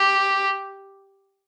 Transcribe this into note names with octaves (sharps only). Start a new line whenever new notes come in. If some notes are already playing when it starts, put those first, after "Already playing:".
Already playing: G4